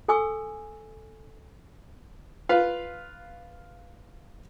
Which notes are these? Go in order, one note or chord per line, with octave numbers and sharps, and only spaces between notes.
A4 G#5 C#6 E6
F4 B4 F5